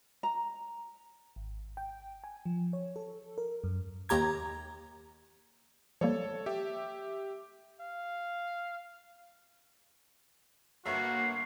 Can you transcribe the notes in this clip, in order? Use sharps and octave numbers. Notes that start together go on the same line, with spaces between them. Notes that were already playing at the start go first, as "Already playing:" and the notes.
A#5
G#1
G5
G#5
F3
C#5
A4
A#4
F#2
D#2 G4 A#5 G#6
F3 G3 A#3 A4 C#5
G4 E5
F5
G1 A#3 F#4 C#5 E5 C7